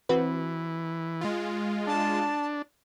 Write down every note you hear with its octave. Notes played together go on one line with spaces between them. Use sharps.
E3 C4 F#4 B4
G#3 F4
D4 A5